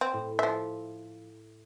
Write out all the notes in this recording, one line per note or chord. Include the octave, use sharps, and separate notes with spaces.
C4
A2
F3 E5